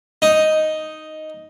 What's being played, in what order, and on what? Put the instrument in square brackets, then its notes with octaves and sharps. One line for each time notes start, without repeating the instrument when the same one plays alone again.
[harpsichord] D#4